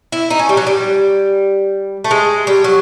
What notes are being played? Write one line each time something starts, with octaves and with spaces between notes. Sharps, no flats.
E4
D#4
C#4
G3
F#3
G3
A3
G#3
G3
F#3